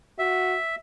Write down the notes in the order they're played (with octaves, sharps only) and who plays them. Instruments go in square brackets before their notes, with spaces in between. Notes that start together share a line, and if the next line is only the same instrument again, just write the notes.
[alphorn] F#4 [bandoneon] E5